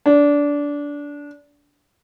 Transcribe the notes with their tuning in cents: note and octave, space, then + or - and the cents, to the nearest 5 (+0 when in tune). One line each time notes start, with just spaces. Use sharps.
D4 -20